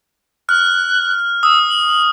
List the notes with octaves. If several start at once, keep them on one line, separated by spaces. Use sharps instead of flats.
F6 F#6
D#6 E6
F#7